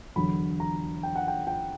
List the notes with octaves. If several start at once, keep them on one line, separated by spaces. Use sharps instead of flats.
E2 D3 F#3 B5
A#5
G5
F#5
G5
G5